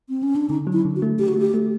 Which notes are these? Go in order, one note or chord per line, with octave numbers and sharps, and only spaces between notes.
C4
C#4
D4
D3 D#4
F#3
E4
D3
F#4
A3
D3 G4
F#4
A3 G4
A3